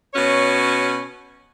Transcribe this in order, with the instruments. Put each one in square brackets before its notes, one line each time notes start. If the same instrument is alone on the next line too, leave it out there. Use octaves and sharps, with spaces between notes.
[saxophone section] B2 C#4 F#4 C#5